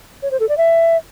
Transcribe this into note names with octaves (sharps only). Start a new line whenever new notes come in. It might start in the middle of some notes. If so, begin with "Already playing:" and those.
C#5
C5
A4
D5
E5